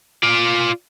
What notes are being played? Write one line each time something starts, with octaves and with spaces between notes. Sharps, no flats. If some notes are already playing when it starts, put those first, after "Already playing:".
F4 D5